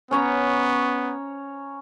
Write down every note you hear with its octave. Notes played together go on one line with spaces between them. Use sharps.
B3 C#4 C#5 A#5